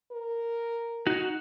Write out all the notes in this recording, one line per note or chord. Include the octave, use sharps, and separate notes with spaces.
A#4
D#4 F#4